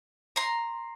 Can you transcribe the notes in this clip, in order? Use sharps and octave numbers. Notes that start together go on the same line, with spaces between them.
A#5 C6